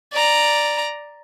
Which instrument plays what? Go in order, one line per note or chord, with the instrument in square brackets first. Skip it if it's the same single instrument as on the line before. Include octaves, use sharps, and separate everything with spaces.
[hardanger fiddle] D5 A#5